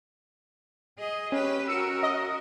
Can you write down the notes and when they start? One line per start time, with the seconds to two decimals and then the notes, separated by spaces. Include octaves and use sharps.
0.98 G#4 D#5
1.32 C#4 G4 B4
1.68 F#4 A#4 E6 C#7 E7
2.03 D#5